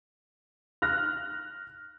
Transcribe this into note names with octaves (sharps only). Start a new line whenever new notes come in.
F6 F#6 A#6